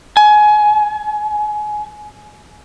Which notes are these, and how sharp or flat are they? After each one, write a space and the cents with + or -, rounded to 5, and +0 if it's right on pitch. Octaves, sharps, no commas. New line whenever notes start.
G#5 +25